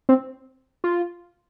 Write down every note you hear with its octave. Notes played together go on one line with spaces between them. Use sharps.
C4
F4